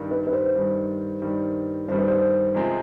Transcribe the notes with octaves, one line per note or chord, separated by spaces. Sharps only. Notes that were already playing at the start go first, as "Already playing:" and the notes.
Already playing: G2 D#3 G3
B4
B4
C5
G2 D#3 G3
G2 D#3 G3
G2 D#3 G3 C5
B4
C5
F2 C3 F3 G#3 C4